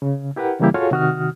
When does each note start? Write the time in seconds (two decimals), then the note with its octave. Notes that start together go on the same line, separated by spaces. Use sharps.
0.02 C#3
0.36 E4 G4 A#4 B4 F#5
0.59 C#3 E3 G3 A#3 E4 G4
0.74 F4 F#4 G#4 A4 C#5 F5
0.91 C3 D#3 F#4 D#6 F6